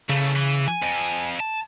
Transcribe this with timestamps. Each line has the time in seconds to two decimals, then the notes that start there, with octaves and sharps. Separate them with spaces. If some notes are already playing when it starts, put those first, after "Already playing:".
0.09 C#3 E3 A3
0.36 E3
0.68 G#5
0.83 F2
1.40 A5